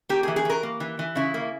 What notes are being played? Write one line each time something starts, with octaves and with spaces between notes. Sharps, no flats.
A#3 G4
G#4
E3
G#4
E3 A#4
A#3
E3
E3
C#3 E4
A#3